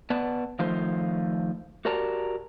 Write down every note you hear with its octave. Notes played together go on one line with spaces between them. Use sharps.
B3 B4 D5 A5
D#3 F3 A3 D#4 F4 C5
F#4 G4 A#4 D5 A5 A#5